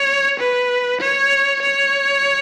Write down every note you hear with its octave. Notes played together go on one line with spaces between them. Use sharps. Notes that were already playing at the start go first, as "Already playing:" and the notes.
Already playing: C#5
B4
C#5
C#5